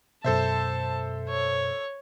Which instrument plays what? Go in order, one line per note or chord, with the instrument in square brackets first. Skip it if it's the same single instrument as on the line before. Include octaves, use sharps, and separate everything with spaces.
[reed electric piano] F#2 B2 [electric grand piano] A4 C5 E5 [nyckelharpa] A5
[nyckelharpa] C#5